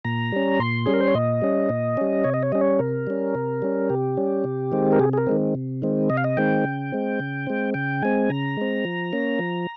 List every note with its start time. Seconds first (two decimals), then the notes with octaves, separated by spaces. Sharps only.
0.05 A#2 A#5
0.32 G3 C#4
0.59 A#2 C6
0.86 G3 C#4 G#4
0.93 A#4
1.00 C5
1.08 C#5
1.15 A#2 D#5
1.42 G3 C#4
1.69 A#2
1.97 G3 C#4
2.24 C3 C#5
2.34 D#5
2.43 C#5
2.52 G3 C#4 D#5
2.61 C#5
2.79 C3 A#4
3.07 G3 C#4
3.35 C3
3.62 G3 C#4
3.90 C3 G4
4.17 G3 C#4
4.44 C3
4.72 D#3 G#3 C4
4.92 A#4
4.99 C3 G#4
5.13 G#4
5.17 A#4
5.27 D#3 G#3 C4
5.55 C3
5.82 D#3 G#3 C4
6.10 C3 D#5
6.17 F5
6.24 D#5
6.37 D#3 G#3 C4 G5
6.65 C#3
6.92 G#3 C4
7.20 C#3
7.47 G#3 C4
7.74 C#3 G5
8.03 G#3 C4 G#5
8.30 C#3 A#5
8.57 G#3 C4
8.85 F3
9.13 A#3 C#4
9.39 F3